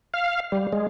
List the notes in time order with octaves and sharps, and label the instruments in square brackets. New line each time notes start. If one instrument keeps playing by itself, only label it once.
[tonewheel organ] F5
G3
G#3